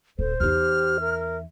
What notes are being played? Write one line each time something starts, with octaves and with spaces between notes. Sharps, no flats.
D#1 A4 C5
E2 D#4 G4 F6
A#4 E5